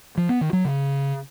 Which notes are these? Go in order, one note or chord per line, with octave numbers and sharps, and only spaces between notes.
F3
B3
D#3
F#3
C#3